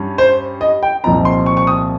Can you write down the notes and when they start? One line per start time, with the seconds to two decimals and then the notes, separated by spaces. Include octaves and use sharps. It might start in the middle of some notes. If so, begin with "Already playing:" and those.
Already playing: G2 G3 C#4
0.18 C5
0.61 D#5
0.83 G5
1.04 C2 A#2 F3 C4 D#4 A#5
1.25 C6
1.46 C#6
1.57 C#6
1.67 D#6